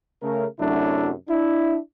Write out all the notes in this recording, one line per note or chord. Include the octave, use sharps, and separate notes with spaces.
C#3 A3 A#4
F#2 C3 F#3 A3 D4 E4
D4 E4